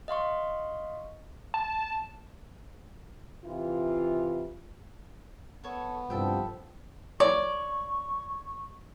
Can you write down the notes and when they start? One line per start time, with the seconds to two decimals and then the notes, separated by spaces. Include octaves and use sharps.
0.08 D#5 F5 C6 C#6
1.54 A5
3.45 C3 E3 F4
5.64 B3 A4 C#5
6.10 C2 G2 F3 A4 E5 G5
7.20 C#5 D5 C#6